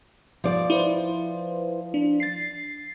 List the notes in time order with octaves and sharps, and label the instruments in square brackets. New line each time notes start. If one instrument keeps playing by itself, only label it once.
[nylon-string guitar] F3 D5
[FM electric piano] E4 B4 C5
D4
A6 C7